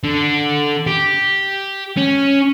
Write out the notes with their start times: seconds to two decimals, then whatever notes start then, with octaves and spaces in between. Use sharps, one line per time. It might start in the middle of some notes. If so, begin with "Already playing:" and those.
0.03 D3
0.87 G4
1.97 C#4